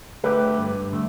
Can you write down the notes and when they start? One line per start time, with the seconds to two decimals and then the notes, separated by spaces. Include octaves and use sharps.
0.24 D3 A3 G4 B4
0.58 G2
0.92 D3 A3